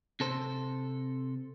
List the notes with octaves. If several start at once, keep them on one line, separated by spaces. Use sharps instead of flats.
C3 A4 C5